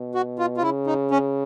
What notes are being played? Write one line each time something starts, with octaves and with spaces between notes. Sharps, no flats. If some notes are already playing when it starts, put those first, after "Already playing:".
Already playing: B2
F#4
F4
F4
C#3 E4
D#4
C#4